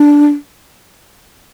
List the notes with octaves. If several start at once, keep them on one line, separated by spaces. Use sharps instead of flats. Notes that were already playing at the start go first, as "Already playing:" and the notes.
Already playing: D4